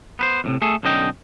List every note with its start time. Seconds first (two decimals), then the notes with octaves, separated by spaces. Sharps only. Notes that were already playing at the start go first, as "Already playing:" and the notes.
0.19 B3 B4 C5
0.44 F2 A2 C3
0.62 A3 G#4 A4
0.83 B1 D3 C#4 D#5 G5